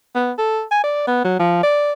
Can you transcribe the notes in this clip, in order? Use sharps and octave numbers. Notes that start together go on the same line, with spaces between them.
B3
A4
G#5
D5
B3
F#3
F3
D5